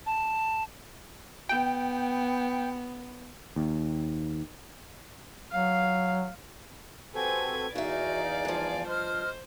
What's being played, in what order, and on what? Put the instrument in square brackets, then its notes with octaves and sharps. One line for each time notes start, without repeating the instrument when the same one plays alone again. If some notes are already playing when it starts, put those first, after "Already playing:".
[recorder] A5
[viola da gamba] B3 [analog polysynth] G5
[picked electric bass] D#2
[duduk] F#3 [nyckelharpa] F5
[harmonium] C4 F#4 A4 [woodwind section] G4 C5 G#5 [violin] B4 G#6
[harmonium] E2 F5 G#5 [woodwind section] D#4 [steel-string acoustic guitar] F#4 E5 [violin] D5
[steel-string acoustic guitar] G2 F3
[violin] C5 [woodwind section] D#5 F6